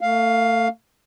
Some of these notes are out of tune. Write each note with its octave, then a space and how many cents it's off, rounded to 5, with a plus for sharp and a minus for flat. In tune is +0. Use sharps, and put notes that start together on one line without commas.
A3 +35 F5 +5